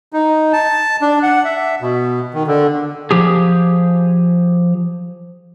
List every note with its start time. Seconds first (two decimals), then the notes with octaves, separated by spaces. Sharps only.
0.13 D#4
0.53 A5
1.02 D4
1.23 F#5
1.45 E5
1.81 B2
2.34 D#3
2.47 D3
3.11 F3 G4 G#4